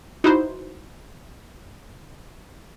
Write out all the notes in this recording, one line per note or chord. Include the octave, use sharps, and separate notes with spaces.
D#4 E4 F#4 B4 C5